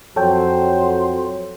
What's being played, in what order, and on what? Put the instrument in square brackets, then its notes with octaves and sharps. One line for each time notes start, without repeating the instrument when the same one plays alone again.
[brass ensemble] F2 F#3 C5 [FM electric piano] A4 C#5 G5